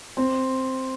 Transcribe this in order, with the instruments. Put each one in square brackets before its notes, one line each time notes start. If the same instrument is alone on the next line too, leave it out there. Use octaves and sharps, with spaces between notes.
[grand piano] C4